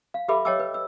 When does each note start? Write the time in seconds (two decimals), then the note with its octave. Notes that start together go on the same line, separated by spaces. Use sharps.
0.14 F5
0.28 G4 A4 B4 E5 B5 D6
0.45 C#5 D#5 G5 A5 D6 E6
0.60 B4
0.74 E6